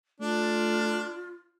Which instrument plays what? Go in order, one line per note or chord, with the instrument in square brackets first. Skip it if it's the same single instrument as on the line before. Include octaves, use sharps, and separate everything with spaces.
[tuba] A3 [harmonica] D4 [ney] F4